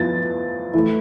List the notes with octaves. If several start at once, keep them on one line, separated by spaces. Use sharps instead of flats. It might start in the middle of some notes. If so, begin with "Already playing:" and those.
Already playing: F3 B3 E4 A6
E3 A3 E4